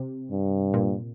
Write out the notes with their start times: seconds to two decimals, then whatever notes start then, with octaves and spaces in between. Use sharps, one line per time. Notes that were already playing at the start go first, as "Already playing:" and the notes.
Already playing: C3
0.31 G2
0.74 A#2